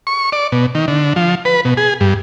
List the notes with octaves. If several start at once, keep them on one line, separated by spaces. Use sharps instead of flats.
C#6
D5
B2
D#3
D3
F3
B4
B2
G#4
G2